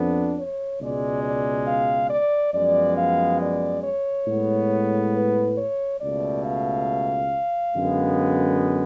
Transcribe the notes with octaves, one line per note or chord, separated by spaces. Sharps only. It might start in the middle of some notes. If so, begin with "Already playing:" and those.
Already playing: F2 F3 B3 D4
C#5
C#2 B2 G#3 D5
D5
F5
D5
F#2 F3 G#3 B3 D5
F5
D5
C#5
A2 G#3 B3
B4
C#5
C#2 B2 A3 D5
F5
F#2 D3 G#3 B3